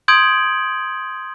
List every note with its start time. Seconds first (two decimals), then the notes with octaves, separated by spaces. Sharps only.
0.08 C6 D#6 G6 G#6 D7 F#7